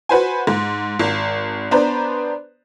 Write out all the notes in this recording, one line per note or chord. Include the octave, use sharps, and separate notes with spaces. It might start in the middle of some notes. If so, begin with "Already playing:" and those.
F#4 B4 C5 G#5
G#2
G#1
B3 D4 B4 C5 D5 A#5